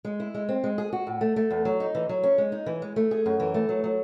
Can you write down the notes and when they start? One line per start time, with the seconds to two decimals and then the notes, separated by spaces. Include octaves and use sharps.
0.05 G#3
0.20 E4
0.34 G#3
0.49 C4
0.64 G#3
0.78 G#4
0.93 F#4
1.07 A2
1.21 A3
1.36 A3
1.51 E2
1.65 F#3
1.80 D#4
1.95 E3
2.09 F#3
2.23 C#4
2.38 G#3
2.52 D#4
2.66 E3
2.82 G#3
2.96 A3
3.11 G#4
3.26 F#2
3.40 E3
3.54 A3
3.69 F#3
3.84 F#3